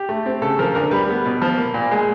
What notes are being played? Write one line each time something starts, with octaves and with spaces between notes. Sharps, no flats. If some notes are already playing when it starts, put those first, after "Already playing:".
Already playing: G4
A3
C4
C#3 A4
F3 A#4
D2 A#4
G3 B4
B3
B2
F3
A#3
A#2
G#3